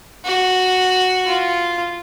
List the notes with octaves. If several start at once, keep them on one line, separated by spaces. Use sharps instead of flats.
F#4
F4